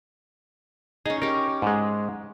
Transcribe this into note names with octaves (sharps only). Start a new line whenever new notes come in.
C#4 D#4 G#4
C#4 G4 A#4
G#2 G#3